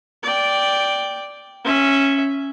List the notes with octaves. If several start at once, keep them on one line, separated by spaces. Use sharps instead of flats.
D5 G5
C#4 E5